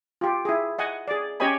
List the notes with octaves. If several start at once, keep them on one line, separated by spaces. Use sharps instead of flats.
F4 G4
E4 G#4
D#5 F#5 G#5
G#4 D5
C#4 G4 C#5 D#5 G#5 B5